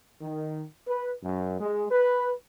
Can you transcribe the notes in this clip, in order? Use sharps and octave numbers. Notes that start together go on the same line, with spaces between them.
D#3
B4
F#2
G#3
B4